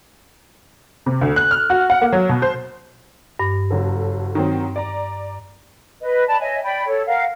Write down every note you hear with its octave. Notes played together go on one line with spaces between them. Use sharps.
C3
D2
F#6
F6
F#4
F#5
A#3
F#3
B2
C5
G2
F#1 F#3 A4
D#3 F#3 C4
D5 A#5
B4 D#5
D5 A5 B5
C#5 D#5 E5 G#5
D5 G5 B5
A4 C#5
A#4 F5 F#5